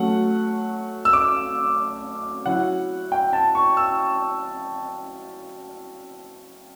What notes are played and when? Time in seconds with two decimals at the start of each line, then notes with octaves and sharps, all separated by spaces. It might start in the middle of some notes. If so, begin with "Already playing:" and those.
Already playing: F#3 A3 C#4 F#5
1.05 E6
1.13 D6
2.46 F#3 C#4 E4 F#5
3.12 G5
3.33 A5
3.55 C#6
3.77 E6